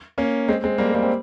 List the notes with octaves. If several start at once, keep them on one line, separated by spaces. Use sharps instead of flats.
A#3 C#4
G#3 C4
G#3 C4
G3 A#3
G#3
G3 A#3
C4